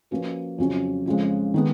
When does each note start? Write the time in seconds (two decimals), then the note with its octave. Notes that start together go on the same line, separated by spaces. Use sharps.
0.11 F3 A#3 C#4 F#4 B4
0.58 F2 C#3 F#3 C#4
1.06 F2 C#3 F3 G#3
1.54 D#3 G#3 B3